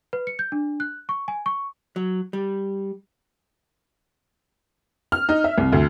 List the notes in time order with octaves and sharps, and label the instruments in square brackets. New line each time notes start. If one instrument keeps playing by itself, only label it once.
[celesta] B4
C#7
G6
D4
F#6
C#6
G#5
C#6
[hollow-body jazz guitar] F#3
G3
[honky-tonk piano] F6
D#4
E5
C2
D2